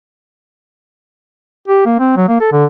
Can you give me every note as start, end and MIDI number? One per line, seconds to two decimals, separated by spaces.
1.68 1.83 67
1.86 1.98 58
1.99 2.17 60
2.17 2.28 54
2.29 2.37 58
2.41 2.52 69
2.52 2.65 50